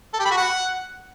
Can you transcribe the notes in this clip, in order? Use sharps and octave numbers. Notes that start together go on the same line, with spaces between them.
A4
G4
B5
F#4
F#5